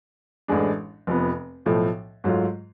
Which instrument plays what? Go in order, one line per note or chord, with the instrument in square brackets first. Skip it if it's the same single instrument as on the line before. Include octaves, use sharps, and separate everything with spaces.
[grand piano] A1 A2 G#3 D4
F1 F2 F3 B3
B1 A2 F3 A3
G#2 F#3 A3 F4